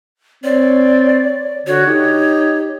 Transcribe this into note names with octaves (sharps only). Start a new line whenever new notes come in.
C4 C#5 D5
D3 F#4 C#5
D#4 G4